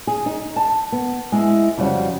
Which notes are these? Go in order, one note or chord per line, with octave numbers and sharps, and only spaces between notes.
G#4
D#4
A5
B3
G#3 E4
F2 C#3 F#3 G3 F#5